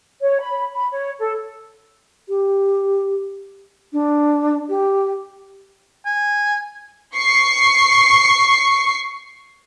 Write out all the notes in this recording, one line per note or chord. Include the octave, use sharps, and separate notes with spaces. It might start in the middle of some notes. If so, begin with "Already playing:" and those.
C#5
B5
B5
C#5
A4
G4
D4
G4
G#5
C#6 C7